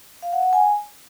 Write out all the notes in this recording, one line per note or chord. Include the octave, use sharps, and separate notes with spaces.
F5
F#5
F#5
G#5